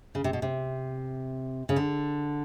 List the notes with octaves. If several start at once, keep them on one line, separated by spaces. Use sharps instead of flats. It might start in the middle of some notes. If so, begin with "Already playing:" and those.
C#3
C3
B2
C3
C#3
D3